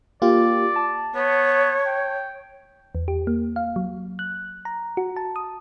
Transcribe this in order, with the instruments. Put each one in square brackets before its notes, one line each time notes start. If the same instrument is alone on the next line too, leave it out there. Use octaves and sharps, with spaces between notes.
[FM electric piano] A#3 F4 G4 [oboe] D5
[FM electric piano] A5
[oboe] B3 [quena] C#5
[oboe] G5
[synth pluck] E2
G4
A#3
F5
F#3
F#6
A#5
F#4
A5
D#6